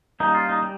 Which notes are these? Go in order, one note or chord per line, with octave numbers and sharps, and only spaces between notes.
G3 A#3 C#4 D#4
F4
D#4
G3